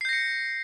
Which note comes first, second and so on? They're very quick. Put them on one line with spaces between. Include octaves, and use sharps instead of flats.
C7 G6 A#6 C#7